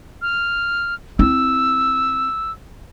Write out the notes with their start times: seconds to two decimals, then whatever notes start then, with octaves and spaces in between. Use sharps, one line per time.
0.22 F6
1.19 C4 E4 E6